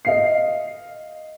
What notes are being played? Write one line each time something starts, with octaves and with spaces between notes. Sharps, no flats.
D#5 F5 C7